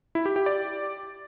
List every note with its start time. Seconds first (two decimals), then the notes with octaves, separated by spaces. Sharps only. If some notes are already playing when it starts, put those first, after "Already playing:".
0.15 E4
0.26 G4
0.36 G4
0.46 D5